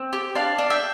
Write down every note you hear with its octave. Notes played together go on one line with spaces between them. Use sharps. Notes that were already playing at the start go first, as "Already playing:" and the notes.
Already playing: C4
G4
D4 D5 F5
D4
E5 G5